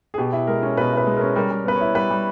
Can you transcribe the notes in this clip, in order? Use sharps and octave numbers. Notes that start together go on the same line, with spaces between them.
G#4
B2 G4
E4
G#3 A#4
C#4
B2 B4
E4 B4
G#3
C#4 A#4
G3 A#4
G3
B3 B4
C#5
E4
G3 B4
G3